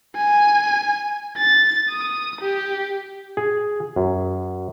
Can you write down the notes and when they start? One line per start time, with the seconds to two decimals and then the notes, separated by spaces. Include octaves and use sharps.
0.16 G#5
1.37 A6
1.90 D#6
2.41 G4
3.37 G#4
3.96 F#2